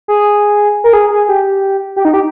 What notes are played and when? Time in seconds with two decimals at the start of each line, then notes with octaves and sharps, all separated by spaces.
0.08 G#4
0.84 A#4
0.93 G#4
1.11 G#4
1.29 G4
1.96 G4
2.05 D#4
2.14 G4